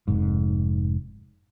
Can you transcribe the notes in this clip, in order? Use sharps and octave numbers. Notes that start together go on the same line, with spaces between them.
F1 G#2